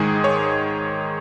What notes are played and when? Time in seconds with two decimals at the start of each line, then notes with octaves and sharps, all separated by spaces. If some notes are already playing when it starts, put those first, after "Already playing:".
Already playing: G#2 D#3 G#3 G#4
0.24 C#5